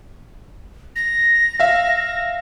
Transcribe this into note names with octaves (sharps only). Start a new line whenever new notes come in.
A#6
E5 F5